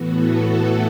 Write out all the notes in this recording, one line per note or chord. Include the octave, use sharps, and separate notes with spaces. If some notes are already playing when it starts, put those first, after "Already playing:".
Already playing: A2 E3 B3 F#4
F#4 A4